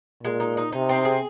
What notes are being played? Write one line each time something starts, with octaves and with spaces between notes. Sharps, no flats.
A#2 G#3
D#4
D#4
C3 D#4
C4
G#4